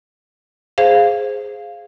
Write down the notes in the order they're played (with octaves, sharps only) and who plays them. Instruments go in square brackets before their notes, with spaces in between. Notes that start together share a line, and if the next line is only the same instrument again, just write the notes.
[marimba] G#4 C5 F5